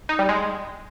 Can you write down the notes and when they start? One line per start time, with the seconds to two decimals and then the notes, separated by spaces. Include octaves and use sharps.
0.09 D#4
0.19 G3
0.29 G#3